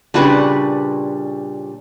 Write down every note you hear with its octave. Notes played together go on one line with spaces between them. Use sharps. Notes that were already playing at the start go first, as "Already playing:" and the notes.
A#2 C#3 G3 D4 F#4 B4